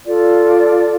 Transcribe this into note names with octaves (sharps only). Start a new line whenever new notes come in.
F4 A4 D5